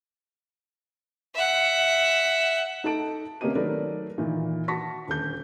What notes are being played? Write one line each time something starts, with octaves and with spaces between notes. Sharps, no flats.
E5 F#5
D#4 A4 A5 D7
C3 A#3 C#4 G4 D#5 D#7
D#3 F#3 A3 A#4 B4 D5
A#2 D#3 E3
F#4 A5 C#6 A#6 B6
D#1 D2 G6